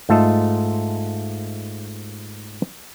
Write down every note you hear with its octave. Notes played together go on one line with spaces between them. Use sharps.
G#2 A3 F4 A4 D#5